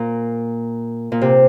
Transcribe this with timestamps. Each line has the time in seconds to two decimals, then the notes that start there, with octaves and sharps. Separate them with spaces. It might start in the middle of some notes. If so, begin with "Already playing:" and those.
Already playing: A#2
1.12 A#2
1.21 C3